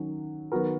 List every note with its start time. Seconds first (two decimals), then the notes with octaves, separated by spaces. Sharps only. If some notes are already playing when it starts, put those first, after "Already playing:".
Already playing: D#3 F#3 C#4
0.52 D#3 F#3 B3 F#4 A#4